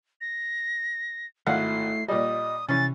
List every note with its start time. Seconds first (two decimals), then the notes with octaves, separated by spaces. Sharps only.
0.21 A#6
1.47 G#1 A3 E4 F5 F#5 C7
2.08 A#2 G3 D#5 D#6
2.69 C3 E3 C#4 A6